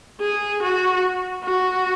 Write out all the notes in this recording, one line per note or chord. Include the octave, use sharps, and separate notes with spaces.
G#4
F#4
F#4